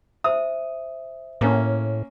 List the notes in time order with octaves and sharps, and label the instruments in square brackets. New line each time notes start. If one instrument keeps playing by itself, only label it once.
[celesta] C5 E5 [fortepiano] D#6
[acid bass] A2 [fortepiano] A#3 C#4